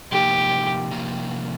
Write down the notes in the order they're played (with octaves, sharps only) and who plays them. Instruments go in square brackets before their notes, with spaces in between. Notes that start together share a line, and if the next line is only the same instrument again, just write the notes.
[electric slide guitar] C3 F3 A#3 D#4 [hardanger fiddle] G4
[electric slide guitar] C3 F3 A#3 D#4